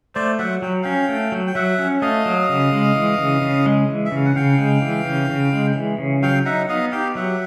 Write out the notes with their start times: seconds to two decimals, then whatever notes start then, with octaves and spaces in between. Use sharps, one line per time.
0.15 A3 C5 D5
0.38 F#3 E5 F#5
0.62 F#3 G5
0.83 C#4 F5 G5
1.09 A3
1.32 F#3
1.47 G5
1.55 F#3 E5 F#5
1.78 C#4
2.02 A3 D#5 F5
2.26 F#3
2.49 C#3
2.72 G#3
2.96 E3
3.18 C#3
3.42 C#3
3.66 G#3
3.88 E3
4.06 E5
4.12 C#3 F5
4.26 F#5
4.36 C#3 F5 G5
4.58 G#3
4.82 E3
5.05 C#3
5.30 C#3
5.53 G#3
5.75 E3
5.98 C#3
6.23 F#3 F5 G5
6.45 D#4 E5 F#5
6.69 B3 D#5 F5
6.92 G4 F5 G5
7.15 F#3 E5 F#5